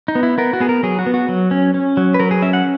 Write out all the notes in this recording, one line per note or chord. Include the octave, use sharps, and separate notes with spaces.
D#4
B3
E4
B3 A#4
F#4
B3 G#4
A#4
F#3 G#4
F#4
B3
F#4
F#3
C#4
C#4
F#3
B4
F#3 A#4
G#4
C#4 E5
F#5